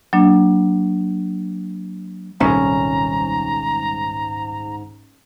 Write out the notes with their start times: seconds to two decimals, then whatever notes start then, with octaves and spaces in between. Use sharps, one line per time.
0.13 F#3 A#3 D4
2.40 D#1 C2 G#2 C#4 A#5